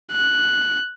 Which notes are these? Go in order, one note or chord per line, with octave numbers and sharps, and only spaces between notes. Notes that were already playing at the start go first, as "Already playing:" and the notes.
F#6